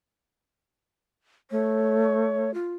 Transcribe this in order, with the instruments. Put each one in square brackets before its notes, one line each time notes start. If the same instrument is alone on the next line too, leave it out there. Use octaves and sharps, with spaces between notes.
[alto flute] A3 [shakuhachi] C#5
[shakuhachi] F4